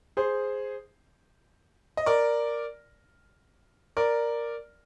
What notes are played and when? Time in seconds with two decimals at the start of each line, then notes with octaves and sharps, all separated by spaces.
0.17 G#4 C5
1.97 D#5
2.06 A#4 D5
3.97 A#4 D5